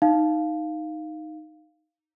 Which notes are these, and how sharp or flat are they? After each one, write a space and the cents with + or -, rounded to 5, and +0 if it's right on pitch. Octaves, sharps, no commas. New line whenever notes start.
D#4 +0 F5 +0